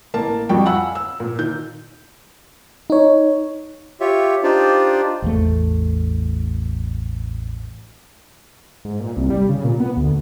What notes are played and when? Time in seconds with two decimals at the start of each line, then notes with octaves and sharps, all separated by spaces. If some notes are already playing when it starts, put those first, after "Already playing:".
0.14 A1 A#3 A5
0.49 F2 G3 F#4 G5 C#6
0.65 F5 F#5 G#5 B5 E6
0.95 E6
1.20 A#2
1.39 D#3 G6
2.90 D#4 C#5
4.01 F4 G4 C#5 E5
4.43 D4 D#4 F4 G4 C5 D5
5.22 A1 E2 A3
8.85 G#2
9.00 A#2
9.17 C2
9.30 G3
9.49 C#3
9.64 A#2
9.80 B3
9.97 D2